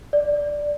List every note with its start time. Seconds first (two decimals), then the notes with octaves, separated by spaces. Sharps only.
0.13 D5